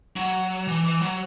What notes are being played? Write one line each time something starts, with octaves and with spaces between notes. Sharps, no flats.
F#3
E3
E3
F#3